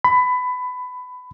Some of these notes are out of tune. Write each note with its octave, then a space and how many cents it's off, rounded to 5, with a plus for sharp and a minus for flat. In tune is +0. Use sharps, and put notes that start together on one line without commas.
B5 +20